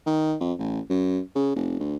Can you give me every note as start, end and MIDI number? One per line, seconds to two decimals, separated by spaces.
0.06 0.35 51
0.40 0.53 41
0.59 0.80 33
0.89 1.20 42
1.35 1.51 49
1.55 1.76 29
1.80 1.96 38